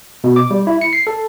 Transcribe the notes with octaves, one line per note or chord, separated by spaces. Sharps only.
B2
D6
G3
E4
C#7
C7
A4